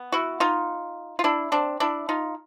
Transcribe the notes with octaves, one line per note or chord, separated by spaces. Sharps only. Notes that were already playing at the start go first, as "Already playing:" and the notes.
Already playing: B3
E4 F#4
D#4 F4
F4
D4 E4
C4 D4
D4 E4
D#4 F4